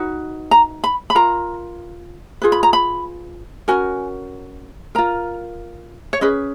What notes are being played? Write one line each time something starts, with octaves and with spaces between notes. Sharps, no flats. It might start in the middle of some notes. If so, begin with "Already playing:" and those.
Already playing: D#4 F#4 B4
A#5
B5
B5
F4 A#4 A#5
F4 G#4 B4
B5
A#5
B5
C#4 F#4 A#4 G#5
F4 A#4 A#5
C#5
C#4 G#4 B4 D#5